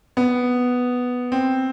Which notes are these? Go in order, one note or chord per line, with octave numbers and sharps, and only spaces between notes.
B3
C4